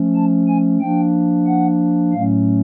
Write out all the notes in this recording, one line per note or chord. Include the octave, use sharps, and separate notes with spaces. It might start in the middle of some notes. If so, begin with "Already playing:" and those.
Already playing: F3 A3 C#4
A5
G#5
F3 A#3 D4 G5
F#5
A2 F#3 A3 C#4 F5